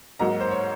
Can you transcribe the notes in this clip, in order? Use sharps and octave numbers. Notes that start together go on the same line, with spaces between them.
G#2 F#3 A#3 D#4 A#5
C5
C#5